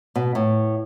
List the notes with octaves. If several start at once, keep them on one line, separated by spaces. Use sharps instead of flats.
B2
A2